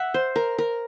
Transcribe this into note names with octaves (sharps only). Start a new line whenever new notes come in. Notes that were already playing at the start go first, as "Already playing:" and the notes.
Already playing: E5 F#5
C5
A#4
A#4